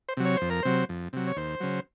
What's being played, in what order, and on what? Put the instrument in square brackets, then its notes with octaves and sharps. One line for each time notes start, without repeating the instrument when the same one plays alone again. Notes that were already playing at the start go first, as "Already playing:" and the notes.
[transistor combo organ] C5
C3 F#3
C#5
F2 C5
A#4
C3 F#3 C5
F2
C3 F#3
C#5
D#2 C5
C#3 F#3